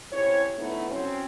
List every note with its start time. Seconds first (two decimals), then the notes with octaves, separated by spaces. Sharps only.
0.12 C3 C#4 E4 C#5
0.57 D3 A3 B3 D#4 E4
0.90 F#3 C4 C#4